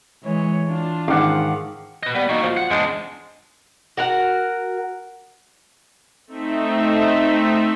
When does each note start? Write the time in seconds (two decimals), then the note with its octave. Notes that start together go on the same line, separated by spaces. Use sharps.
0.23 E3 G#3 C#5
0.66 D4 F4
1.08 G#2 D#3 F5 F#5 D6
2.03 B4 D#5
2.15 G3 B3
2.29 A#3 D#4 F#4
2.43 F3
2.57 F#5
2.70 E2 G#3 D4
3.97 F#4 A#4 F#5
6.27 A3 C4 D#4 E5